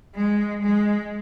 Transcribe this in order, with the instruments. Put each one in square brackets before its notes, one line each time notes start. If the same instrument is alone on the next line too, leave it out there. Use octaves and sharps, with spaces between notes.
[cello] G#3
G#3